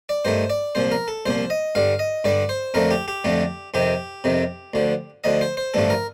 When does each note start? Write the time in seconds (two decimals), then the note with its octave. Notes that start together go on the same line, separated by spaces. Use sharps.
0.09 D5
0.25 G2 D#3 A3 C5
0.50 D5
0.75 C2 A#2 F3 C5
0.92 A#4
1.08 A4
1.26 C2 A#2 F3 C5
1.50 D#5
1.75 G2 D3 G3 F5
1.99 D#5
2.24 G2 D3 G3 D5
2.49 C5
2.74 F2 D3 F3 A3 A#4
2.91 G4
3.08 G4
3.24 F2 D3 F3 A3
3.74 F2 C3 D#3 G4
4.24 F2 C3 D#3
4.74 D2 D3 F3
5.24 D2 D3 F3 D#5
5.41 C5
5.57 C5
5.74 A1 G2 D3 F3 A3 A4
5.90 A#4